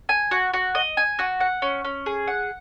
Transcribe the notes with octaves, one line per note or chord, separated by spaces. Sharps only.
G#5
F#4
F#4
D#5
G#5
F#4
F#5
C#4
C#4
G#4
F#5